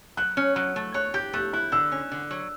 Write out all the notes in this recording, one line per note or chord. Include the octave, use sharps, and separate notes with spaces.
F#3 F#6
C#4
F#3 F#6
A3
C#5 F#6
G4 G6
A3 F#6
E4 F#6
D3 E6
C#4
D3
F#3